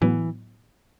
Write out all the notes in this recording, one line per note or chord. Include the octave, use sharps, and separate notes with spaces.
A2 E3 F#3 B3